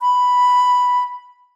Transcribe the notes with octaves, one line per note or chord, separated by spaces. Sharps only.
B5